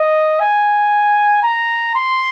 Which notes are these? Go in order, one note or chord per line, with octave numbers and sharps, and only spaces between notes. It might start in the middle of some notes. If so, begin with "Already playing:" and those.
Already playing: D#5
G#5
A#5
C6